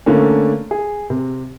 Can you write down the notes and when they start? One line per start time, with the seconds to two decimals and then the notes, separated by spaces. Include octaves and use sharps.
0.06 D3 A3 A#3 C#4
0.71 G#4
1.10 C3